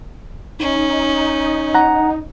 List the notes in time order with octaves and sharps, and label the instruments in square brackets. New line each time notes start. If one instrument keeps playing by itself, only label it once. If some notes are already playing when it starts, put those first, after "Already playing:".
[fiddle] C#4 [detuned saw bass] D#4
[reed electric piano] F#5 A#5